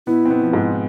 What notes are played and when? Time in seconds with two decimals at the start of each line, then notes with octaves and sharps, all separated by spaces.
0.07 B2 B3 E4
0.25 C4
0.30 B2 B3
0.42 F3
0.53 G#2 G#3